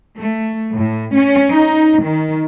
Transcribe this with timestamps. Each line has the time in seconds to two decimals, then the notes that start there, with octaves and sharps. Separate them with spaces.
0.18 A3
0.73 A2
1.15 C#4
1.52 D#4
2.05 D#3